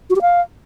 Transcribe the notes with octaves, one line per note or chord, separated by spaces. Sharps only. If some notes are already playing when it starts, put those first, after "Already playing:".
F#4
G4
F5